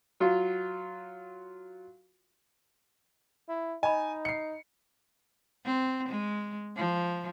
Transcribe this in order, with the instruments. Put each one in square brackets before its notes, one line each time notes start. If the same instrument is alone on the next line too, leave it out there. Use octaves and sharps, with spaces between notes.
[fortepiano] F#3 F4
[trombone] E4
[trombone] D#4 [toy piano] D#5 B5 [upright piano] G#5
[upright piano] C7 C#7
[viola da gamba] C4
G#3
F3